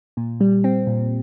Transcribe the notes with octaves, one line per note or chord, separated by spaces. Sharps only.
A#2
G3
C4
A#2